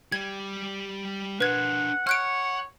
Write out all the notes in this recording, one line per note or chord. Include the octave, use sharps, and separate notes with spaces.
G3 G4 G#6
D4 A#4 B4 F#5 G#6
C#5 F#5 F6 F#6 D7